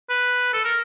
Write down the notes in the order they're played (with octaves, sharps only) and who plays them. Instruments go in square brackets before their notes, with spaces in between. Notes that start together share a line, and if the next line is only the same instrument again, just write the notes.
[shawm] B4
A4
A#4